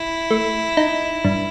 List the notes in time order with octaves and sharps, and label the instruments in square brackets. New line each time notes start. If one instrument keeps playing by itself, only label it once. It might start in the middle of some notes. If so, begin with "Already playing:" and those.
Already playing: [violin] E4
[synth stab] A3
D#4
G2